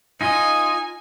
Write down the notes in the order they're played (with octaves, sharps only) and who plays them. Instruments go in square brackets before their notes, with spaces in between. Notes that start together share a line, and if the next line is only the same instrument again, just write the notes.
[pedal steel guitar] D#4 F4 D#5 [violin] G#5